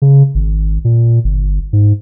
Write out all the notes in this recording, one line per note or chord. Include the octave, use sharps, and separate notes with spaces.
C#3
G#1
A#2
G1
G#2